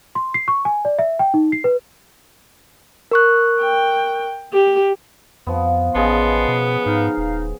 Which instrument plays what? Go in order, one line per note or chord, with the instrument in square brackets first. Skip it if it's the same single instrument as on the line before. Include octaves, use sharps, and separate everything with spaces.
[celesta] C6
C7
C#6
G#5
D5
E5
G5
D#4
C7
B4
[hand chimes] A#4 C#6 F#6
[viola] G5
G4
[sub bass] F2 [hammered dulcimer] F3 B3
[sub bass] A1 [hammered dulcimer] C#3 G#4 [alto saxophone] B3 [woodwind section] D#5 A5 C6
[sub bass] B2
[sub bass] G#2 [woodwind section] D#4 F5
[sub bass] D#1